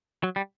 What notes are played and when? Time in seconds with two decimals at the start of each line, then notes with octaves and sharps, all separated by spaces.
0.23 F#3
0.36 G3